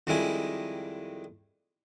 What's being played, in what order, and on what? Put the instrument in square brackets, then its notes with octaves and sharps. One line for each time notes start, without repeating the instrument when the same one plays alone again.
[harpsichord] F2 D#3 G3 G#3 E4 G#5